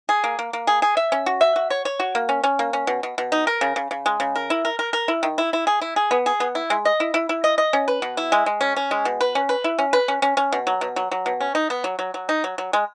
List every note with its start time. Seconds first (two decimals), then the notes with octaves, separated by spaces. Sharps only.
0.09 G#4
0.24 A#3
0.39 A#3
0.53 A#3
0.67 G#4
0.82 G#4
0.97 E5
1.12 C#4
1.26 F#4
1.41 E5
1.56 F#4
1.70 C#5
1.85 C#5
2.00 F#4
2.15 A#3
2.29 C#4
2.44 C#4
2.59 A#3
2.73 C#4
2.87 B2
3.03 B2
3.18 B2
3.32 D#4
3.47 A#4
3.61 C#3
3.76 C#3
3.91 C#3
4.06 G#3
4.20 C#3
4.36 A#4
4.50 E4
4.65 A#4
4.79 A#4
4.93 A#4
5.08 E4
5.23 D#3
5.38 E4
5.53 E4
5.67 G#4
5.81 E4
5.96 G#4
6.11 B3
6.26 G#4
6.40 B3
6.55 E4
6.70 G#3
6.85 D#5
7.00 E4
7.14 E4
7.29 E4
7.44 D#5
7.58 D#5
7.73 C#4
7.88 B4
8.02 B2
8.17 E4
8.32 G#3
8.46 G#3
8.61 C#4
8.76 C#4
8.91 G#3
9.05 B2
9.21 B4
9.35 C#4
9.49 B4
9.64 E4
9.79 C#4
9.93 B4
10.08 C#4
10.22 C#4
10.37 C#4
10.52 B2
10.67 F#3
10.81 B2
10.96 F#3
11.11 F#3
11.26 B2
11.40 C#4
11.55 D#4
11.70 B3
11.84 F#3
11.99 F#3
12.14 F#3
12.29 D#4
12.44 F#3
12.58 F#3
12.73 G#3